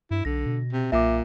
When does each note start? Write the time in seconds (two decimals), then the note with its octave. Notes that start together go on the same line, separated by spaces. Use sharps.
0.11 G2 E4
0.25 B1 D3 A#6
0.46 B2
0.73 C3
0.92 B1 A#2 E5 D6